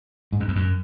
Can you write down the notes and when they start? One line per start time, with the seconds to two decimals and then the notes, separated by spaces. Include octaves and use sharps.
0.32 G#2
0.40 F#2
0.48 E2
0.56 F#2